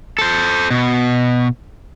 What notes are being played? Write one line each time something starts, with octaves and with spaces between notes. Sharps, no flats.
A4 C5
B2